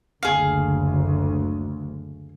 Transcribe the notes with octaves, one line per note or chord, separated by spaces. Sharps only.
F#1 D2 G#4 F5